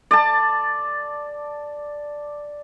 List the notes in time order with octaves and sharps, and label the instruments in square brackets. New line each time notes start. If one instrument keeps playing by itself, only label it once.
[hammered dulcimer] D5 A5